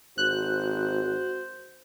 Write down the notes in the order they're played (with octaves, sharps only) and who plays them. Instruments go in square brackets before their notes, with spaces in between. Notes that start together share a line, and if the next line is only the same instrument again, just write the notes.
[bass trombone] G#1 [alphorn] F#4 [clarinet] C5 [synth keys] F#6